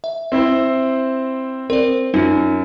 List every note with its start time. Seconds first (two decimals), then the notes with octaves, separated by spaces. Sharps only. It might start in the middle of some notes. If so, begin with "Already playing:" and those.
0.04 E5
0.32 C4 E4 C5
1.70 C4 A#4 D5
2.14 F#2 D#4 F4